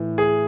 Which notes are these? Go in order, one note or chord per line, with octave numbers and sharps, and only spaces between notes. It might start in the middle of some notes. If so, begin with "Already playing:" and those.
Already playing: A2 E3
G#4